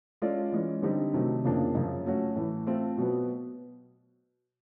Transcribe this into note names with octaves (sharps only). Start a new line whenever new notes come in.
G#3 C#4 F4 A4 D5
E3 G#3 C#4
D3 G3 C4 D#4 G4
C3 D#3 F#3 A3
F2 C#3 F3 A#3 D4
F#2 C#3 F3
F#3 A3 C#4 F#4
A2 E3 A3
A3 C4 F4
B2 F#3 B3